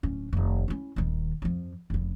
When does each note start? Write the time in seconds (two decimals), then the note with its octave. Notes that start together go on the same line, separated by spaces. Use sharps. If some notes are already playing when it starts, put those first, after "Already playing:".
0.03 D1 C#4
0.33 F1 D#3
0.68 C#4 E4
0.96 D#1 D#3
1.42 F2 F3
1.90 F1 C#3